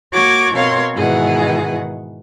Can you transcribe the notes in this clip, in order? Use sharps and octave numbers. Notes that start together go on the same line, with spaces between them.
A#3 F#4 C#5 C#6 D6 G#6
B2 C4 A#4 C#5 F5 C6
G#2 B2 D#3 E3 G#4 F#5